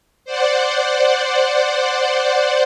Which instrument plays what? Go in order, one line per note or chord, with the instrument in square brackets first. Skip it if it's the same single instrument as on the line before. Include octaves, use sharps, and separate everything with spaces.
[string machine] C5 D5 F#5